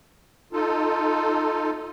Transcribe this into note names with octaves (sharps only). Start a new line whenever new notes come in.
D#4 F4 A4